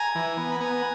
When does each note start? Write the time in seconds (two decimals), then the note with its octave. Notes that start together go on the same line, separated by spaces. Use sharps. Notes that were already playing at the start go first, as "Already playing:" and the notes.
Already playing: G#5 A#5
0.15 E3
0.37 B3
0.52 B5
0.60 B3 G#5 A#5